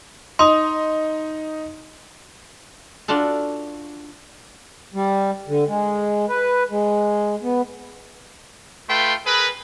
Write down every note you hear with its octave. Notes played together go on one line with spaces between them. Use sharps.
D#4 C6 D#6
D4 F4 F#4 A4
G3
D3
G#3
B4
G#3
B3
A3 F4 B4 G5 C6
G#4 A#4 B4